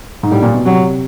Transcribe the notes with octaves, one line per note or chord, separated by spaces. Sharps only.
G#2
A2 G3
A#2
B2
C3 F#3